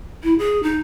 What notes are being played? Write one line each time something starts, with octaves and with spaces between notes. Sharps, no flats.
E4
G#4
D#4